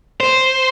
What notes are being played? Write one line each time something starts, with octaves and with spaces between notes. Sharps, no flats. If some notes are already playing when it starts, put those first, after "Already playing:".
C5